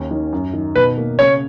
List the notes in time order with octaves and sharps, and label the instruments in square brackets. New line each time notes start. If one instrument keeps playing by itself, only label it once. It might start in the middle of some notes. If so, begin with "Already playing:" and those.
Already playing: [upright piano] D#2 C#4
D#3
F#2
D#3
[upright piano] B2 [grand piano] B4
[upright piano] A#3
[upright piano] C#3 [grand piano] C#5